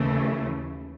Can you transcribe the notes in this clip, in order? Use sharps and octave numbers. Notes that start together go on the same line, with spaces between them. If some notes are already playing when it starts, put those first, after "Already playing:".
Already playing: D#2 C#3 E3 A3